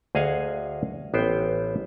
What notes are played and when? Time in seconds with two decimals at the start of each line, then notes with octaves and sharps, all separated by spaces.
0.15 D2 G#4 D#5 F5 F#5 G#5
1.14 A1 B3 C5 G5